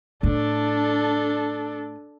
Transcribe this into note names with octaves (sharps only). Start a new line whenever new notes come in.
A2 A3 D4 A4